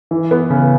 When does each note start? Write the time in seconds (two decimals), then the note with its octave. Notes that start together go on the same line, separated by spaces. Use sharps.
0.11 E3
0.31 B3
0.50 C#3